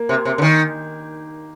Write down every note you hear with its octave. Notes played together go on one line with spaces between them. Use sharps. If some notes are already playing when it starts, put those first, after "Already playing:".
Already playing: A#3
C3
C3
D3
D#3